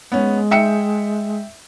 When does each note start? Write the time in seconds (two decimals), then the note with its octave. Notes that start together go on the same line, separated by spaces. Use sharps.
0.12 G#3 B3 C#4
0.51 E5 G5 C#7